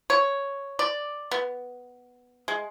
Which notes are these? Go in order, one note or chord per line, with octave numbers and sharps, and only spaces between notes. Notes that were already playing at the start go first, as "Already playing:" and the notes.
C#5
D5
B3
G#3